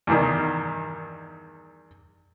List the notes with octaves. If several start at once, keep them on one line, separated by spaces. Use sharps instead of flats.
E2 G2 D#3